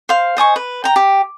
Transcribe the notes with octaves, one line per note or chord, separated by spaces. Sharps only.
C5 F5
C5 D#5 G#5 C#6
B4
G5 A#5
G4